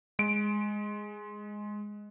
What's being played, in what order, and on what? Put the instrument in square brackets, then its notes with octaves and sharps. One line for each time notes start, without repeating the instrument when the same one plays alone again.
[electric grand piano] G#3 D7